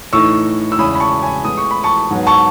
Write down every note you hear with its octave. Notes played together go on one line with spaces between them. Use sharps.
A2 E3 A3 D#4 C#6 E6
E6
E2 C#3 G#3 C#4 E4 B5 D#6
B5
A5 C#6
G#5 B5
A2 G#3 B3 E4 D#6
C#6
B5
A5 C#6
G#2 F#3 B3
A5 C#6